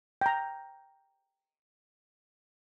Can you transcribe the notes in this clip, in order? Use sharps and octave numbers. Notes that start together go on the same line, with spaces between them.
G5 A#5